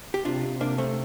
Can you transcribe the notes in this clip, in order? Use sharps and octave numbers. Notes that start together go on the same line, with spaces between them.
G4
C3 D4 F4
C3
C3 A#3 D4
C3 A3 C4